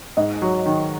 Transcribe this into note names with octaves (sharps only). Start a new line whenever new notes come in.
G#2 D#5
F#3
D#3